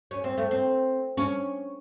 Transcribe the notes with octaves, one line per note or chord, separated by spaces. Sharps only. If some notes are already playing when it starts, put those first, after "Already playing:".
C#4
C4
A3
C4
C#4